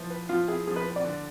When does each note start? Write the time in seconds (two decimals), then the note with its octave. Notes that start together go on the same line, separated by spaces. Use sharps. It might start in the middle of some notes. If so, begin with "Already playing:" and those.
Already playing: F3 B3 E4
0.10 B4
0.29 F3 F4
0.48 E4 G#4
0.67 F3 G#4
0.76 B4
0.86 B4
0.96 D5
1.05 D3